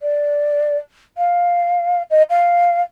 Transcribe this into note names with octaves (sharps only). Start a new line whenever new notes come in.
D5
F5
D#5
F5